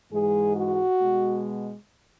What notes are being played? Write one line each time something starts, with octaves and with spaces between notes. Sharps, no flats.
G#2 E3 G#3 G#4
F#4
B2 G#3